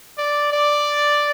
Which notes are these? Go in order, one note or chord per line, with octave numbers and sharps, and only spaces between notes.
D5
D5